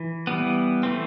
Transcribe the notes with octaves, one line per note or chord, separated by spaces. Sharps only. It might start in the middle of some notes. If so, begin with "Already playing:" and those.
Already playing: E3
E3 G3 B3
E3 A3 C4